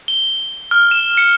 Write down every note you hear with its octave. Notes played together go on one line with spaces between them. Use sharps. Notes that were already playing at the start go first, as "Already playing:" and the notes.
G7
F6
E7
C#7